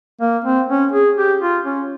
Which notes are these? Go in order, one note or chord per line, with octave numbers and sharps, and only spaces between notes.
A#3
C4
C#4
G#4
G4
F4
C#4